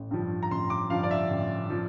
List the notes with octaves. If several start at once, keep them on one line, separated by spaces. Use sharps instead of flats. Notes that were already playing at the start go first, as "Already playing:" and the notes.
Already playing: A1
G2 F3
A#5
A1 C6
D6
G2 F3 F5
D5
E5
A1
F3